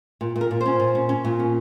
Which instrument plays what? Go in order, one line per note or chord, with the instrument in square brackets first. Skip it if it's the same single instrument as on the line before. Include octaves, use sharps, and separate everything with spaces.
[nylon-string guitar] A#2
A#2
A#4
A#2
C5
C#4
A#2
C#4
C#4
A#2
C#4